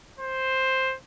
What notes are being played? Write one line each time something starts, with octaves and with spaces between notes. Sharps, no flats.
C5